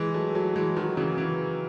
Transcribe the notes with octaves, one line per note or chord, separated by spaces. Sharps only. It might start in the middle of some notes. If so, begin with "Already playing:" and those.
Already playing: E3 G#3
F#3 A3
F#3 A3
E3 G#3
D#3 F#3
C#3 E3
C#3 E3